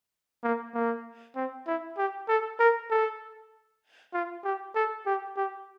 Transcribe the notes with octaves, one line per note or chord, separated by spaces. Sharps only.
A#3
A#3
C4
E4
G4
A4
A#4
A4
F4
G4
A4
G4
G4